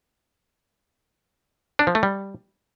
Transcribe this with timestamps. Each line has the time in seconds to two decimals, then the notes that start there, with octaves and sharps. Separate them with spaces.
1.79 D4
1.87 F3
1.95 A3
2.03 G3